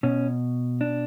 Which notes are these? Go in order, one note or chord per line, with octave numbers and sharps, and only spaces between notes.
B2 C#4
D4